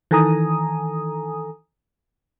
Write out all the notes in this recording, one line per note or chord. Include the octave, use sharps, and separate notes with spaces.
D#3 E3 A4 G#5 A#5 D#6